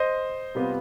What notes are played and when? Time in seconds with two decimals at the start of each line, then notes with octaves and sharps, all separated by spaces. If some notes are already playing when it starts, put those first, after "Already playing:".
Already playing: C5 D#5
0.55 C3 G3 B3 F4